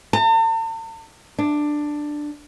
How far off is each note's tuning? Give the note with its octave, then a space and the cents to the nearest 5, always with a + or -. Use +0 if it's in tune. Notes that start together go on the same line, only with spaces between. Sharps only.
A5 +45
D4 +10